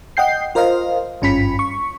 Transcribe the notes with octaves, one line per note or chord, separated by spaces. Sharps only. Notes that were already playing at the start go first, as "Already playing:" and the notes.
D#5 F#5 G5 G6 C7
F4 A#4 C5 D#5 F5
G#1 G2 C#4 F4 B5 B6
C#6